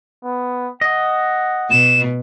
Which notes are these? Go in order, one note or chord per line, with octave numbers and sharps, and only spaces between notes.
B3
D#5 F#5
B2 E7